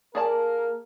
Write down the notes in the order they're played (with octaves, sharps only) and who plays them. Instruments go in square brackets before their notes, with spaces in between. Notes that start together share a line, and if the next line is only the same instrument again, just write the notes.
[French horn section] A#3 [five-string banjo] G#4 D5 A5 [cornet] A#4